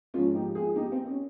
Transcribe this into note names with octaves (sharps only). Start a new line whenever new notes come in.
G#2 F3 C#4 F4
D#4 G4
F4 G#4
D#4 G4
C4
C#4